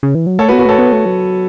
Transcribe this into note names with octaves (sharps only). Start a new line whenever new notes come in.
C#3
E3
F#3
A3 A4 C#5
F#4 B4
B3
F#4 B4
A3 A4 C#5
B3
A3
F#3